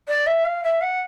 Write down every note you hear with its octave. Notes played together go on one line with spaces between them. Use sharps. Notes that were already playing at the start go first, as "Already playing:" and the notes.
D5
E5
F5
E5
F#5